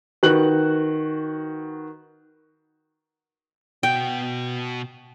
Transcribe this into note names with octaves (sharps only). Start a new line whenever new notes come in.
D#3 F#4 B4 F#6 F#7
B2 F#4 G5